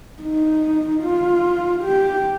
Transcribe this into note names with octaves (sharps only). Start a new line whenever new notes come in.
D#4
F4
G4